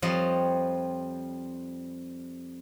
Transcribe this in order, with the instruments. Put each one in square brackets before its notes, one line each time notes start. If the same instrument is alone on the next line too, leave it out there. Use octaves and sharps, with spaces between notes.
[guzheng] F2 F3 G3 C5 C#5 D#5